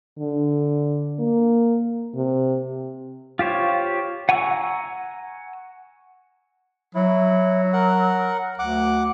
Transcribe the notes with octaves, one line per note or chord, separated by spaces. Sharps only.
D3
A#3
C3
F4 G4 C5 C#5
F#5 G#5 A#5 C#6 E6
F#3 E4
A#4 F#5
D2 F#5 D6